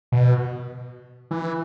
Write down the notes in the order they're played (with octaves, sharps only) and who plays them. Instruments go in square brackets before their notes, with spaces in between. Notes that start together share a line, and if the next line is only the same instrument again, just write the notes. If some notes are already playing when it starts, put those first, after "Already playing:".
[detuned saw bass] B2
E3